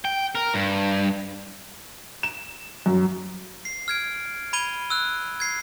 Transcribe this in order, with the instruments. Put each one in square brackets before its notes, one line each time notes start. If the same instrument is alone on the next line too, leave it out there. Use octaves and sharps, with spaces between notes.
[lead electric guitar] G5
A#4
G2
[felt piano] E7
F#2
[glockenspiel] C7
F6 G#6 D7
B5 G#6 D#7 G7
E6 F#6
G#6 C7